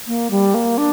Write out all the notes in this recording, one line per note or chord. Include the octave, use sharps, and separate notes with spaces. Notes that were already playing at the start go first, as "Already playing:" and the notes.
A#3
G3
A#3
D4